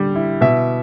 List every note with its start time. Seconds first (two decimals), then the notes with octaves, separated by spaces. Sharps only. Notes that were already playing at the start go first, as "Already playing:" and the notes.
Already playing: D3 G3
0.16 E4
0.41 B2 E5